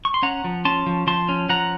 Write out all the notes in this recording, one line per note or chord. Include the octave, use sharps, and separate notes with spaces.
C#6
C6
C#4 F#5 A#5
F3
C#4 A5 C6
F3
F3 A5 C6
C#4
F3 F#5 A#5